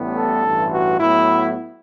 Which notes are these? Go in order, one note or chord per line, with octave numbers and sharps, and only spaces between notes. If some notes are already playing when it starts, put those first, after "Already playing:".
Already playing: A1 A2 G3 B3
A4
A1 G2 E3
F#4
A2 F#3 B3 E4